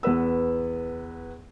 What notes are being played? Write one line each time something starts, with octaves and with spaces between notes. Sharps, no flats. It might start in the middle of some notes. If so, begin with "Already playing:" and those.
E2 B3 B4 E6